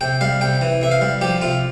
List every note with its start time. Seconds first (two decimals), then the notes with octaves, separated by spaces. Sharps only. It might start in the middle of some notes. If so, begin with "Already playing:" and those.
0.01 C3 G5
0.21 G3 F5
0.41 C3 G5
0.61 E3
0.82 C3 E5
0.91 F5
1.01 G3
1.21 F3 G4
1.42 C3 F4